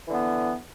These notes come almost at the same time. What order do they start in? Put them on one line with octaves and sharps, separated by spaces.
E3 D3 B3